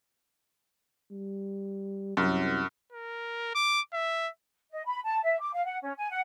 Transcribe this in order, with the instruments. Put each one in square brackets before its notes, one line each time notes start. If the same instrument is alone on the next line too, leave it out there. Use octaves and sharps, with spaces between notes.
[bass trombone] G3
[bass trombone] C2 [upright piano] F#2
[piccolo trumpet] A#4
D6
E5
[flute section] D#5
B5
A5
E5
D6
F5
F#5
C#4
G#5
F#5